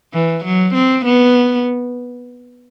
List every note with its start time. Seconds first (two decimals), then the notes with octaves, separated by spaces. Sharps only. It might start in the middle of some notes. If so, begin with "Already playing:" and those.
0.13 E3
0.44 F#3
0.74 C4
1.05 B3